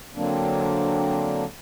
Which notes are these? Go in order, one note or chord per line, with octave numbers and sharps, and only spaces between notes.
D3 F#3 A#3 C4 D4